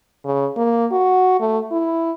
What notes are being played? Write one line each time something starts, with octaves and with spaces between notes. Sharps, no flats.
C#3
A#3
F#4
A3
E4